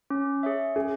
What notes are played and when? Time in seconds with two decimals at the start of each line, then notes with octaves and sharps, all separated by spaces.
0.10 C#4
0.43 G#4 C#5 E5
0.76 C#4 G#4